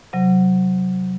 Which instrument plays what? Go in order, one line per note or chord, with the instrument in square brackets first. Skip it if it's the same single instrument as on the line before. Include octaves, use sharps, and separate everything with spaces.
[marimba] C3 F#3